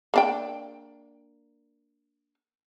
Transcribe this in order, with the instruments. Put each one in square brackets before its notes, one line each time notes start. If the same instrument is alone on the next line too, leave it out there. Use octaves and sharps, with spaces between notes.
[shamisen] A#3 D4 G5